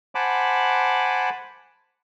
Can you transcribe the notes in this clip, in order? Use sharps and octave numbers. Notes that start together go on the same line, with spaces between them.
C5 F#5 G#5 A5 B5 D6